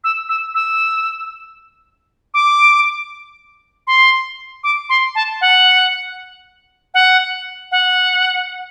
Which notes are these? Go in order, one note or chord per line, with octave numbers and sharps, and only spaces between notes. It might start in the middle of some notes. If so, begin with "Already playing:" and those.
E6
E6
E6
D6
C6
D6
C6
A5
F#5
F#5
F#5